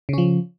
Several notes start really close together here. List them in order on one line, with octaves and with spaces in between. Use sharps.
C#3 C#4 F3